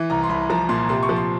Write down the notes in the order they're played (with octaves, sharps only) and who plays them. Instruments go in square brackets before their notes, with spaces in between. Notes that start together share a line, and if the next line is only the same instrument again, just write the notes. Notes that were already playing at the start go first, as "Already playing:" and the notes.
Already playing: [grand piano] E3
C2 A#5
C6
C2 B5
F3 A#5
A#2 C6
C3 C6
C#6
F3
C6